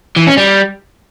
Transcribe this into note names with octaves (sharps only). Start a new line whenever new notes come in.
E3
C#4
G3